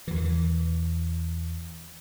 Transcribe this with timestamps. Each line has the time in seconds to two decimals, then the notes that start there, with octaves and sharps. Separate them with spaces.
0.07 E2 B2 E3
0.16 D#3
0.25 E3